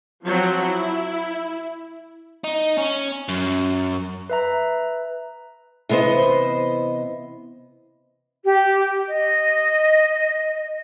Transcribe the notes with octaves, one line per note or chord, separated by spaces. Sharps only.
F3 F#3 C4
E4
D#4
C#4
F#2
B4 E5 A#5
C3 E3 B3 C5 D#5
G4
D#5